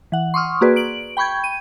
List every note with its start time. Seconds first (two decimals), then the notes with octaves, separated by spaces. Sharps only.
0.12 E3 F#5
0.34 C6 C#6 D#6 F6
0.61 A#3 F#4 G#4 B4 D5
0.76 D7 F#7
1.17 G5 B5 C#6 G6 G#6
1.44 D#7